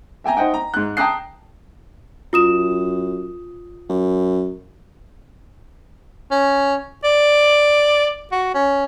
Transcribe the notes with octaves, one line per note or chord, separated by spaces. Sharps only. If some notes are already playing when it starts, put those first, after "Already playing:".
E5 G5 G#5 A#5
D#4 C5 D#5 F#5 G5
A#5
G#2 F#6
G5 A5 A#5 D#6 F#6 C7
F#2 F4 D#6 E7
F#2
C#4
D5
F#4
C#4